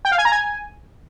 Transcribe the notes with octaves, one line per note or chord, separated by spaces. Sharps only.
G5
F5
G#5
A#5
G#5